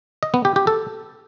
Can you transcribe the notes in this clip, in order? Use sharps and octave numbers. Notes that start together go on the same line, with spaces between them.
D#5
B3
G4
G4
A4